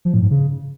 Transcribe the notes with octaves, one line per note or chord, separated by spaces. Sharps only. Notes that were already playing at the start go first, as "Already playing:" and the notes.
F3
A2
G#2
C#3